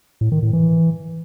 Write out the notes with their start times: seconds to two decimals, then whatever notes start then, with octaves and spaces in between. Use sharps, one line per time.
0.21 A2
0.32 D#3
0.42 A2
0.53 E3